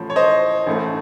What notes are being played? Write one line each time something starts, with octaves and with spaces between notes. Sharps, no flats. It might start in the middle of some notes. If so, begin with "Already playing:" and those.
Already playing: A1 A2 F3
C#5
C5 D#5
A1 A2 A3